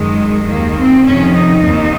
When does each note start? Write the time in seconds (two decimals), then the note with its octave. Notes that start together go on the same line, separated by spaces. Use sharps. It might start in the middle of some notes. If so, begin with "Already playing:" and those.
Already playing: F#2 D#3 G#3
0.48 D#2 D#3 A#3
0.76 C4
1.05 F2 C3 D#3 C#4
1.33 D#4
1.62 D#2 D#3